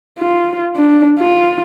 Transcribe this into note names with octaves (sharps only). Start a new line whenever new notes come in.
F4
D4
F4